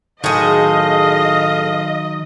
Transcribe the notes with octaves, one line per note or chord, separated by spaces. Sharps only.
A2 D#3 F#3 G#4 C5 D#5 F5